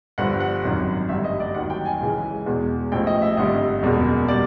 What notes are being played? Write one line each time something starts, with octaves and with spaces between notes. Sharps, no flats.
G1 G2 D3 F3 F#5
F#5
G#1 F#2 D#3 F#3
A1 G2 D3 E5
D#5
D5
D#2 D#3 F#3 F#5
G5
G#5
C#2 C#3 E3 G#3
E2 B2 G#3
A1 A2 F3 G5
D#5
E5
G#1 G2 D3 G3 D#5
F#1 E2 B2 G#3
B2 G3 D5